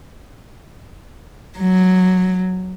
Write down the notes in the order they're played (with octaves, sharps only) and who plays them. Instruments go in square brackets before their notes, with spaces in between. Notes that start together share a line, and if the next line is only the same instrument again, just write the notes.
[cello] F#3